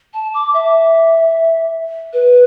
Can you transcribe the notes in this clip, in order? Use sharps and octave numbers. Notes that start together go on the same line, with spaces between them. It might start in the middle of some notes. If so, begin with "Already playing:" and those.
A5
D6
E5
B4